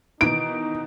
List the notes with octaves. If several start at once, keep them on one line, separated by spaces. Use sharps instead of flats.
B2 D#3 E3 D#4 D7